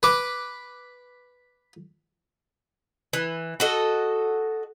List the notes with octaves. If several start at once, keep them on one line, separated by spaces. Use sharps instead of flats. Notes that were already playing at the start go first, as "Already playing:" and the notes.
B4 D6
E3
F#4 A4 D#5